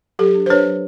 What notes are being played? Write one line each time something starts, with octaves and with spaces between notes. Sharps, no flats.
F#3 G4 A4
D4
C5
D4 B4 C#5
F#3